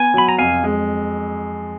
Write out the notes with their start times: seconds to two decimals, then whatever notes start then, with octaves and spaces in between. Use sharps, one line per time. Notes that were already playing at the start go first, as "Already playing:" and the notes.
Already playing: B3 G#5
0.14 F#3 B5
0.29 A#5
0.38 F2 F5 G#5
0.64 G#3